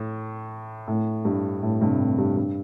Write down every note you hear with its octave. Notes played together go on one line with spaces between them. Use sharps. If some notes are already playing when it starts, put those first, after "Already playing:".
Already playing: A2
A2
G2
A2
G2 C3
A2
G2
G2